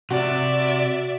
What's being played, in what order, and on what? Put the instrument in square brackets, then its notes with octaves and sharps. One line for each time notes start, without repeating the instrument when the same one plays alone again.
[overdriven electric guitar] C3 [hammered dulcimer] F#4 [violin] D5 E5